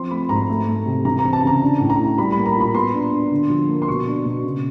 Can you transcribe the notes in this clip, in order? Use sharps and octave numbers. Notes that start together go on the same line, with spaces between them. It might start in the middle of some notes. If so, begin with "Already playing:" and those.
Already playing: F3 C4 C6
A3 B5
G#2 A#5
A3
A3
C3
E3 A#5
A#5
C4
A5
C#3 A#5
D4
A2
A#5
A2
G3 B5
A#3 B5
A#5
A#2 B5
B3 C6
D4
D4
D3
F3
A#3
C6
B2 C#6
D4
B2
C#3